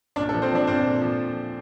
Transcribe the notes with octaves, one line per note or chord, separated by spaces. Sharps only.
A#2 D4 D5
A4
F3
C4 C5
F3 D4 D5
A#2 C4 C5
A#2
F3